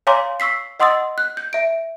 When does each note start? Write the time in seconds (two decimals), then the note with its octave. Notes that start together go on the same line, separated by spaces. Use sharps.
0.07 C#5 F5 G#5 A#5 C6 D6
0.40 C#6 E6 B6 C7
0.80 D#5 F#5 C6 D#6 E6 A6
1.18 F#6
1.37 G6
1.53 E5 D7